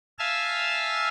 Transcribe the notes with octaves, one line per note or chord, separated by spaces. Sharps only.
E5 F5 G#5 A5 E6 F6